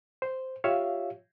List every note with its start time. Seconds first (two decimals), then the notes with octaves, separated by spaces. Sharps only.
0.22 C5
0.64 F4 G4 C#5 E5 F5